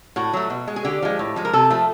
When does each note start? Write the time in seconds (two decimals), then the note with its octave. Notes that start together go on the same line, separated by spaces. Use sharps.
0.16 A2 F#4
0.33 F#3 A3
0.50 B2
0.67 G#3
0.76 G#4
0.85 D3 G4
1.02 F3 G#3
1.19 A2
1.36 F3 G#3
1.45 A#4
1.53 C3 A4
1.70 F3 A3